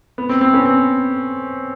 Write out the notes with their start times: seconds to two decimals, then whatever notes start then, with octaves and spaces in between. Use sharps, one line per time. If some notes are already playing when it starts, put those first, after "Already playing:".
0.18 B3
0.29 C4
0.41 C4
0.54 B3 C#4
0.65 C4